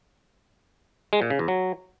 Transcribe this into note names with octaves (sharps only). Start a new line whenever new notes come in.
G#3
A#2
C#3
E2
F#3